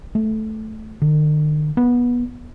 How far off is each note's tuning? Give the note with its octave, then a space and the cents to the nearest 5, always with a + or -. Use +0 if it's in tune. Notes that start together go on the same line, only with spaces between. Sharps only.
A3 -10
D#3 -45
B3 -20